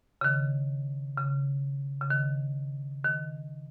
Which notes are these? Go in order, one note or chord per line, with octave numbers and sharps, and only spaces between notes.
C#3
D#3
C#3
C#3
D#3
D#3